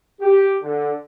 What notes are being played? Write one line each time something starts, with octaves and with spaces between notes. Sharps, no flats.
G4
D3